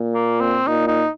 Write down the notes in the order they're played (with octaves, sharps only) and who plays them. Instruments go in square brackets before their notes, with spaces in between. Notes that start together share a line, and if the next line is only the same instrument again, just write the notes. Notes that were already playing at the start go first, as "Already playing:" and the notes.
Already playing: [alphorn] A#2
[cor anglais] A#3
C4
[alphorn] A#2 [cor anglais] D#4
[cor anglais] D#4